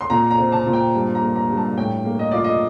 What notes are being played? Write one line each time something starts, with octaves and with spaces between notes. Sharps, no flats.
C6
A#2 A#5
A#5
C4
A5
A#2
G5
G2
A#5
A#3
A#5
G2
A5
A2 G5
A#3
D#5
F4 D5
D#5